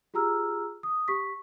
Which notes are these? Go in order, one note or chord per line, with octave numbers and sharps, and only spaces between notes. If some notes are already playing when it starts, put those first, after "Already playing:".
F4 G4 G#4 A#5 E6 F6
D#6
G4 C#6 B6